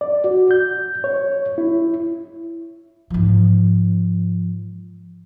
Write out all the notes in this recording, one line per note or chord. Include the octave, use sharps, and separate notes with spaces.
D5
F#4
G6
C#5
E4
G#2 F3